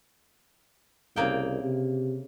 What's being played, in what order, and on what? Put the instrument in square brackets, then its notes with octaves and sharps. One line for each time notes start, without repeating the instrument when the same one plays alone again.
[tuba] C2 [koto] C#3 A#3 G5
[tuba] C3